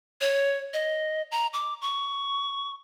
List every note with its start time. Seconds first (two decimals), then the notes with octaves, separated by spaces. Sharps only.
0.21 C#5
0.73 D#5
1.31 A#5
1.53 D6
1.82 C#6